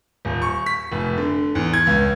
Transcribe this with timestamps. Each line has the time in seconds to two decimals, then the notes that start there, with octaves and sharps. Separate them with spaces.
0.25 D#1
0.42 C#6
0.66 B6
0.92 F1
1.18 D3
1.55 E2
1.73 G#6
1.87 C#2